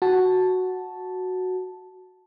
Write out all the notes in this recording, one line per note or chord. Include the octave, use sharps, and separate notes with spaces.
F#4 A5